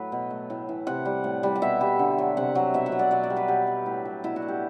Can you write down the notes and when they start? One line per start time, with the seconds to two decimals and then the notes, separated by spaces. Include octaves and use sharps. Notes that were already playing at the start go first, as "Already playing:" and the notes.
Already playing: A2 F#3 A3 A4 B4
0.12 B2
0.31 A3
0.50 A2
0.69 E3
0.87 C3 F#5
1.05 G3
1.24 A2
1.43 G3
1.56 F#5
1.62 B2 E5
1.81 G3
1.99 D3
2.18 F#3
2.37 C3 F#5
2.55 F#3
2.74 B2 E5
2.86 F#5
2.92 F#3
2.99 D5
3.11 B2 D5
3.23 D5
3.30 G3
3.37 B4
3.48 B2 G4
3.67 F#3
3.86 A2
4.05 F#3
4.23 B2 E4
4.36 F#4
4.42 A3
4.48 G4